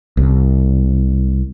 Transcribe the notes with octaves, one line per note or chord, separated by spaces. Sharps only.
C2